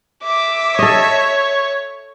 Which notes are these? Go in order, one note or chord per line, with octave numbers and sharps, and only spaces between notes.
E5 D6
A4 C#5 D#5